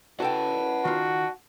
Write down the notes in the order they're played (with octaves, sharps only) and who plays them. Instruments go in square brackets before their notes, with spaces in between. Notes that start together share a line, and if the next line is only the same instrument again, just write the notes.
[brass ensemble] C#4 E4 B4 [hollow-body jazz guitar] F#4 A4 G5 [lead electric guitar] F#5 A5
[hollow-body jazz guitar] D#3 F4 [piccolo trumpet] F#4